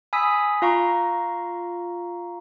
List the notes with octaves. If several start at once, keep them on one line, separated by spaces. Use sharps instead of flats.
G#5 B5 D#6 E6 B6
F4 F5 A#5 C#6